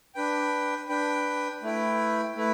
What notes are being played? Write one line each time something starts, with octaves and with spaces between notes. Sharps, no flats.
D4 B4 G5
D4 B4 G5
A3 E4 B4 G5
A3 E4 B4